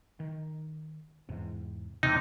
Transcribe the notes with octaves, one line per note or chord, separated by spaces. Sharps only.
D#3
E2 G#2 C3
E2 A2 C3 D#4